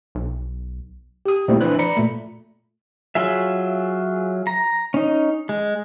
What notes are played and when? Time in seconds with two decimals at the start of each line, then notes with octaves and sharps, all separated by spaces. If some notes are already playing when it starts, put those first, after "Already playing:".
0.15 B1
1.26 G4 D#6
1.48 A#2 G3 A3 C4 E4
1.61 E3 F3 D4 B4 C5 F#6
1.79 D5 A#5 B5 C#7
1.97 A#2 A3
3.15 F#3 F4 G#4 E5
4.47 A#5
4.94 C#4 D#4
5.49 G#3